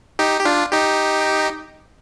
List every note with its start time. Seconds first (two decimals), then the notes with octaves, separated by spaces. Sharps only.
0.19 D#4 G4
0.40 G4
0.45 D4 F4
0.72 D#4 G4